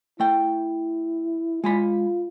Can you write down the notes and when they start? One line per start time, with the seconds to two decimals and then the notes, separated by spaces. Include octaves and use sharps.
0.20 A3 E4 G5
1.64 G#3 F4 G#5 B5